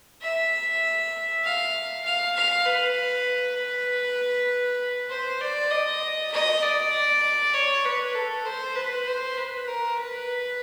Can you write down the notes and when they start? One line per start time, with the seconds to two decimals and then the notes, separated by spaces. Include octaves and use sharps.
0.22 E5
1.44 F5
2.05 F5
2.35 F5
2.66 B4
5.10 C5
5.41 D5
5.71 D#5
6.32 D#5
6.62 D5
7.54 C#5
7.85 B4
8.15 A4
8.45 C5
8.75 B4
9.07 C5
9.37 B4
9.67 A#4
9.97 B4